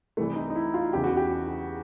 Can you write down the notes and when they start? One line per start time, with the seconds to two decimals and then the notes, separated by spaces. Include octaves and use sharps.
0.17 C2 C3 E3 A3
0.36 D#4
0.50 D#4
0.55 E4
0.74 F4
0.93 E2 C#3 E3 G4
1.04 F#4
1.17 G4